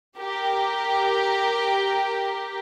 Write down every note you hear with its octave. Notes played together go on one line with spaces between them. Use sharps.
G4 A#4